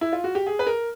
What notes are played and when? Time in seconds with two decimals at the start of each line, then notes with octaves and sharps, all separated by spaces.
0.01 E4
0.13 F4
0.24 F#4
0.35 G4
0.47 G#4
0.59 B4
0.67 A#4